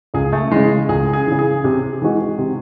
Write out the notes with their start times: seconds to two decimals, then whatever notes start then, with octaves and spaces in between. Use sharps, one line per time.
0.14 C#2 G#4
0.33 A3
0.51 C#3 E3 G#3
0.89 C#2 G#4
1.13 G#4
1.27 C#3 E3
1.39 G#4
1.64 C3
2.02 E3 G#3 D#4 F#4
2.38 C3